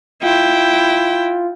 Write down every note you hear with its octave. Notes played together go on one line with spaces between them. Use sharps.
E4 F4 G5